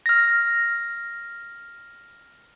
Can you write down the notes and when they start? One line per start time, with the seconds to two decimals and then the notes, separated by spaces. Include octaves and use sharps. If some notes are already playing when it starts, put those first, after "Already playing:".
0.06 F6 A#6